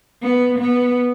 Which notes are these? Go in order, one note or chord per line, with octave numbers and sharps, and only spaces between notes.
B3
B3